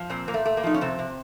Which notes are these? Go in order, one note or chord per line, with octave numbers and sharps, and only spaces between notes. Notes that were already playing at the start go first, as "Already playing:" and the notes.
Already playing: F3
A#2 C4
A#2 A#3
A3
A3
A#3
F3 D#4
C#4
C3 C4
C3